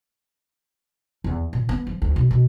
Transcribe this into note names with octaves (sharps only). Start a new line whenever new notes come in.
E2
A#2
B3
F3
D2
B2
B2